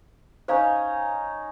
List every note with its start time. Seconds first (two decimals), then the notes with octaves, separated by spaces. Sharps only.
0.48 C#4 D#4 C5 C#5 F5